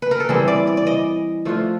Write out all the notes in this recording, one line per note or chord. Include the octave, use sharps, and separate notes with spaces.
B4
A#4
A4
E3 G3 C4 E4 G#4
D5
D5
D5
D#5
F3 A3 D4 F4